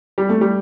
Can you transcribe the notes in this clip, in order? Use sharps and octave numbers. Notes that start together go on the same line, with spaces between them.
G3
A3
G3